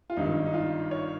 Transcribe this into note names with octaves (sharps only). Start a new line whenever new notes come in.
F4
G#1 G2 D#3 D#4
D#4
F4
C#5